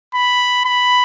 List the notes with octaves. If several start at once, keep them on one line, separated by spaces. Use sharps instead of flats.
B5
B5